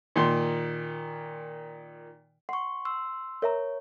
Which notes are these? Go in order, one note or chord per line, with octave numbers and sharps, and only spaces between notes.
A#2 D#3 C6
F#5 C6 C#6
C6 E6
A#4 C#5 E5 A#5